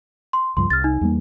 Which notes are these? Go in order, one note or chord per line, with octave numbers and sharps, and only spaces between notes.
C6
C#2 G2 F3 C6
C2 F6 A6
D#4
E2 G3 A#3